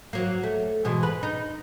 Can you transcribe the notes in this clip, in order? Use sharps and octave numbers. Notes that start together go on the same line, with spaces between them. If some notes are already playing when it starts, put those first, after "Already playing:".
F#3 A#3
A3
B2 E3 G#3
B4
D#4